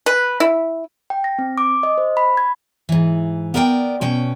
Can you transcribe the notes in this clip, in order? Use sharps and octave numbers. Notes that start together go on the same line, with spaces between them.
B4
E4
G5
A#6
C4
D6
D#5
C5
B5
G#6
G#2 E3
B3 A#4 D5 F5 G5
B2 C#4 G5